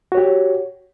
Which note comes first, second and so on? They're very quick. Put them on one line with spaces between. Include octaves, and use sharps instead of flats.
F#4 C#5 G4